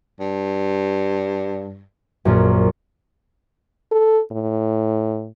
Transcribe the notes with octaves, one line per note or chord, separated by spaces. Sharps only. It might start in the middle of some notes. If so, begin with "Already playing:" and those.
G2
A#1 F#2
A4
A2